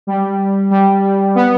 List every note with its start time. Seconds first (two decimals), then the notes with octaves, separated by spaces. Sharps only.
0.07 G3
0.71 G3
1.35 B3